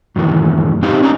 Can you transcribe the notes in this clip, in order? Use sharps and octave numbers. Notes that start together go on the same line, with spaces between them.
F#2 A2 D#3 E3
C4 D#4 G4 C5 D#5 F5
C#4 D5 D#5 A#5